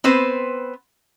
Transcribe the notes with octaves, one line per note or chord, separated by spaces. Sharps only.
B3 C4 B4 C5